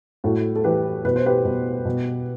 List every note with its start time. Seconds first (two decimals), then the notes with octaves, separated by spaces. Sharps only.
0.24 A2 F#4 A4
0.56 A4
0.64 E3 G4 B4
1.05 B2 B4
1.16 C5
1.26 G4 B4
1.45 B2
1.85 B2